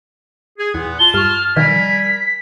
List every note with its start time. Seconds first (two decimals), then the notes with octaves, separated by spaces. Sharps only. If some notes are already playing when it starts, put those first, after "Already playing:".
0.58 G#4
0.74 E2 A#2 B3
0.99 F4 A5 G7
1.14 G2 C#6 F6
1.56 B2 D#3 F3 G3 A#4 G#5 B6